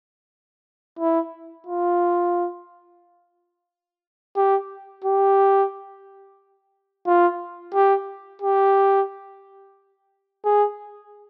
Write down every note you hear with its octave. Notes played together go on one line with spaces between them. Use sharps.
E4
F4
G4
G4
F4
G4
G4
G#4